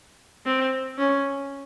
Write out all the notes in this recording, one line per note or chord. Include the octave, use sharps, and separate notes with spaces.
C4
C#4